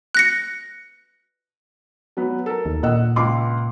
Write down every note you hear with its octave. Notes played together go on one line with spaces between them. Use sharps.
F#6 A#6 C#7
F#3 B3
A4 A#4
D#2
A#2 D#5 F#5 E6
C#2 C6 D6